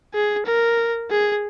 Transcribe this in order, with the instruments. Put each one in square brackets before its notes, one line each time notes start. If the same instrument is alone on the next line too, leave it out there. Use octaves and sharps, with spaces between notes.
[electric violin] G#4
A#4
G#4